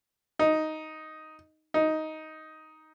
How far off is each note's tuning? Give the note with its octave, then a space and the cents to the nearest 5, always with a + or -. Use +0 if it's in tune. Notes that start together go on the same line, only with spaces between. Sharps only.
D#4 +5
D#4 +10